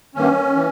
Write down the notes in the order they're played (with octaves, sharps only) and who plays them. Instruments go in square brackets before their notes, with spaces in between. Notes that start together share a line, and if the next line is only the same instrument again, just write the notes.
[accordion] G2 D#3 A#3 C#4
E3